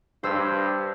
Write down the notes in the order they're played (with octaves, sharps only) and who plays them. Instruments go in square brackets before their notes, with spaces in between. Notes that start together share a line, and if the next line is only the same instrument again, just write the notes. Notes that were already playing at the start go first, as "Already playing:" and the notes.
[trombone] G2 [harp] C5 E6